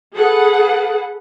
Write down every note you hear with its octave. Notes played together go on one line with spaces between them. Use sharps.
G#4 A4 B4 F#5